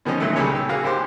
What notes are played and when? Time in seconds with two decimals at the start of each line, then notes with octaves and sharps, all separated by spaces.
0.05 B2 D#3 F3 C#4 D#5
0.20 A#2 D3 D#3 F#3 A3
0.36 C#2 G3 G#3 A#3 A4 C#5
0.53 G5 E6
0.69 A#3 F#4 G#4 A#4 F5
0.84 G#1 G4 C5